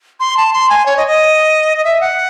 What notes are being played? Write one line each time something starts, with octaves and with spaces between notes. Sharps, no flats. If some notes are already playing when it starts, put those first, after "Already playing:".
C6
A5
C6
G#5
C#5
D#5
D#5
D#5
E5
F#5